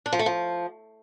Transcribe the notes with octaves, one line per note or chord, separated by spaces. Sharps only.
D4
F3
A3
F3